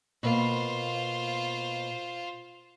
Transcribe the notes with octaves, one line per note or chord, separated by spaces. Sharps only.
B2 A#3 F4 C5